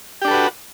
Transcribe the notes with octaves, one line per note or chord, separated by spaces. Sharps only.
D4 F#4 G4 A4 B4